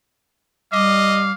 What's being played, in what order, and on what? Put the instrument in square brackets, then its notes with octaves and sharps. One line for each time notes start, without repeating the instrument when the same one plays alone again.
[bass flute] G3 [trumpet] D#5 [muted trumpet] F5 [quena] D6